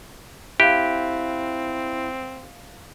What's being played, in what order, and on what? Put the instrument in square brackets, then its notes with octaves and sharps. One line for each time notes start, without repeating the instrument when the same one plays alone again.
[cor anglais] C4 [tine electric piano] E4 [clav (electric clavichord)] G4 [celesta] F5 F#6